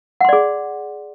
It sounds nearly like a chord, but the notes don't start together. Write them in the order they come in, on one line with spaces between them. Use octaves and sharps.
F#5 C6 D5 G#4